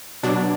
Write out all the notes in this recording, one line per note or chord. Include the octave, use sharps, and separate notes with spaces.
B2 F#3 D4